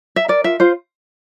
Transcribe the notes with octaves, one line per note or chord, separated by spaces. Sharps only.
E5
A#4 D5
F4 E5
F4 C5